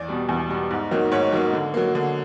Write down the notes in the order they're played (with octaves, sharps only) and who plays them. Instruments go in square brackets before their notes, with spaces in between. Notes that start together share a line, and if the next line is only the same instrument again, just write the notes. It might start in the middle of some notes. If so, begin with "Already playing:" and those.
Already playing: [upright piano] E2 D5
B2 G3
E2
B2 G3
G#2
D#3 F#3 A#3
G#2 C#5
D#3 F#3 A#3
D3
F#3 A#3
D3